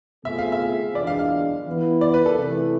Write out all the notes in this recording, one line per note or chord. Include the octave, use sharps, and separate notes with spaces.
B2 A3 C4 F4 G#4 E5
F5
E5
E2 B2 G#3 D4 D5
F5
F5
E3 B3 E4
D5
B4
A4
C3 E3 A3